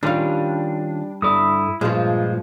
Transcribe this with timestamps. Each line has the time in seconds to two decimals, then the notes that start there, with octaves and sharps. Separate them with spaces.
0.03 D#3 G3 C#4 D4 F4 F5
1.22 G2 E4 A4 D5 D#6
1.81 G2 A#2 F3 G#3 F4